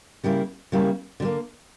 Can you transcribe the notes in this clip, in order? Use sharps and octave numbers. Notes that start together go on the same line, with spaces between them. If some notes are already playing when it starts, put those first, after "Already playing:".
C#3 G3 A#3 E4
C#3 G3 A#3 E4
D3 G3
A#3